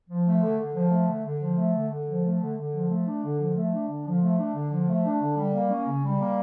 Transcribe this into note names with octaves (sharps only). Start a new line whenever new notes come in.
F3
A3
D3
D3
F3
A3
D3
D3
F3
A3
D3
D3
F3
A3
D3
D3
F3
A3
D4
D3
F3
A3
D4
D3
F3
A3
D4
D3
F3
A3
D4
D3
G3
A#3
C#4
C#3
G3
A#3